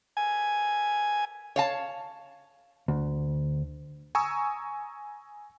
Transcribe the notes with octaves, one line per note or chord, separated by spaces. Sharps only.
G#5
C#5 F5 A5
D2
G#5 A#5 C#6 D#6 E6